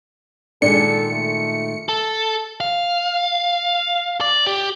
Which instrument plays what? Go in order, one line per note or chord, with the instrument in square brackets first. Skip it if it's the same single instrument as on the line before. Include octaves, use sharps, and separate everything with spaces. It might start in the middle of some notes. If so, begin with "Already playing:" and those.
[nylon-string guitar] A#2 D#3 G#3 [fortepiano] D4 [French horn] A4 [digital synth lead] C#7
[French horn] A3
[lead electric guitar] A4
F5
D5
G4